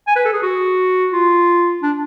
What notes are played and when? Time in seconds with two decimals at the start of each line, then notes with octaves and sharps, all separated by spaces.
0.07 G#5
0.16 B4
0.25 A4
0.33 G#4
0.42 F#4
1.12 F4
1.82 D4